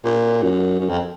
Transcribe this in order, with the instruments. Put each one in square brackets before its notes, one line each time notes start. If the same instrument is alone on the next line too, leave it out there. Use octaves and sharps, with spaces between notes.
[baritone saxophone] A#2
F#2
F#2
F2